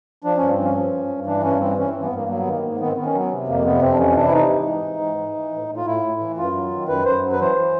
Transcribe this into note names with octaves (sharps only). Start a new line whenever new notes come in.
F3 D4
G2 C#4
C4
F3
C#4
F3
G2
G2
E3 D4
G2 C#4
E3 C4
E3 C#4
G2 C4
B3
G2 A#3
F#3 A#3
B3
D#3 A#3
G#2
D#3 B3
C4
D#3 B3
C#4
F#3 B3
C3
F2 A#3
C3 B3
F2 C4
D4
E3 C#4
C3 D4
E4
E3 D#4
G#2
E3
G#2
E3
E3
E3
A2
A2
F4
A2 E4
A2
E3
F#2 F4
F#3
D#3
F#2 B4
F#2 C5
F#3
B4
E3 C5
E3